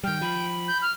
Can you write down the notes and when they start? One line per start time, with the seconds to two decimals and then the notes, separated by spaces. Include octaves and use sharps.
0.04 D#3 G3 G5 F6
0.21 F3 B5
0.68 G6
0.82 F6